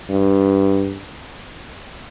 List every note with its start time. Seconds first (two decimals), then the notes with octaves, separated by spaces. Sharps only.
0.10 G2